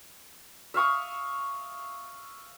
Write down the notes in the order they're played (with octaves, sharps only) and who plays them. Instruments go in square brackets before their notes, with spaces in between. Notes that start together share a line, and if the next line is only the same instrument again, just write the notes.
[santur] E5 F5 C#6 D#6